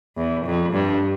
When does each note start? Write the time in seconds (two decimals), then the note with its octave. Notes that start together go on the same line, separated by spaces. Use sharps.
0.17 E2
0.46 F2
0.73 G2